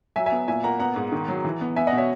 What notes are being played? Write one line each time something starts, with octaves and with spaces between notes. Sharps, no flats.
F#3 E5 G#5
E5 G#5
B3
A#2 E5 G#5
A#3 F#5 A#5
B3 F#5 A#5
G#2
D#3
F#3
E3
B3
B3 E5 G#5
D#5 F#5
B2
C#5 E5